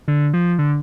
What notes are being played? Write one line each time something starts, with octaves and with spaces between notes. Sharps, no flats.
D3
F3
D3